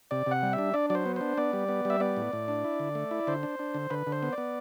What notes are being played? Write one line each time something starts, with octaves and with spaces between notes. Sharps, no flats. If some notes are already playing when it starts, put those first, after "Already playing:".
C3 D5
C3 F#5
G3
E5
D4
D4 D5
F#3 D5
C5
B3
D4 C5
B3 D5
G3
B3
G3 E5
B3 D5
A2
A2
D4
E4
D3
A3
E4
D3 C5
D4
D4
D3
D3 B4
D3
C5
B3
D5
B3